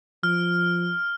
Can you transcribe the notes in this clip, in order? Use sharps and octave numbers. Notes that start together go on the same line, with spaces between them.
F3 F6